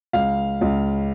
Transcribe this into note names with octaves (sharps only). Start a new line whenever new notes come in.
C#2 F5
C#2